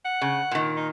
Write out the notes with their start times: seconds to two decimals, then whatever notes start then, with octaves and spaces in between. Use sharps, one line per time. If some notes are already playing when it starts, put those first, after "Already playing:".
0.05 F#5
0.22 C#3
0.51 A#2 D#3
0.76 D#4